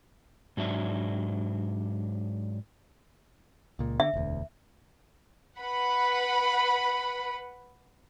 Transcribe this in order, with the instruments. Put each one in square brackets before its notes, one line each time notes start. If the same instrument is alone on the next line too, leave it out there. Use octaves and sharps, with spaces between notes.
[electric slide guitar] G#2 F#3 D4 E5
[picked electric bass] C#2 A#2
[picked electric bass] D3 [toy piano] E5
[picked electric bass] E1 D2
[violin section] B4 F#5 B5